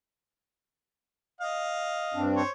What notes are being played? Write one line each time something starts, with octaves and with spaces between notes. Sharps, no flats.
D#5 F5
G2 C4 D4
C5 C#5